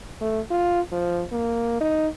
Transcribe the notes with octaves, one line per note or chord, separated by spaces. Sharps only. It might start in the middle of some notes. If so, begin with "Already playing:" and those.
A3
F4
F3
A#3
D#4